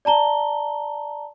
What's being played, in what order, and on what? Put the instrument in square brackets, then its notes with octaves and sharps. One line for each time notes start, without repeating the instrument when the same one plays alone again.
[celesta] D5 A5 A#5 G7